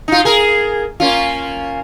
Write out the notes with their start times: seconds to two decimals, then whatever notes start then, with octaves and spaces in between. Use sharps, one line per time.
0.08 D#4 F4
0.25 G#4 A#4
1.00 A#3 C#4 F4